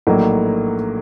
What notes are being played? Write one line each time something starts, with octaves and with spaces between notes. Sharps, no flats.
A#1 A2 F#3 A#3 D#4